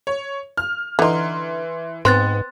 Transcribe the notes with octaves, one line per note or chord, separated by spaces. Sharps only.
C#5
F6
D3 E3 D#4 C6
G#2 B3 C4 C6 F#6 A6